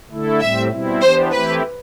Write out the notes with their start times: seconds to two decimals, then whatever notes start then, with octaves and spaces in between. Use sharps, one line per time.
0.10 D3 A3 E4 A4
0.40 A2 G3 C4 E5
0.70 B2 G3 C4 E4
1.01 E3 B3 D4 G4 C5
1.32 E3 A3 C4 E4 G4 B4